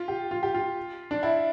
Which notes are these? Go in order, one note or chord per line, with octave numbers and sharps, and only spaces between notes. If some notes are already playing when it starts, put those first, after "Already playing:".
Already playing: F4
G4
F4
G4
F4
D4
E4